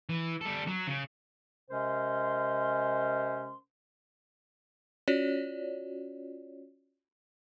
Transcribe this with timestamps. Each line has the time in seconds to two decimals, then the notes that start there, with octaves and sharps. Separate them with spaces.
0.09 E3
0.41 G3 A4
0.67 F#3
0.87 C#3
1.71 C3 G#3 C#4 A#4 C5 C6
5.08 C#4 F4 F#4 C#5 D5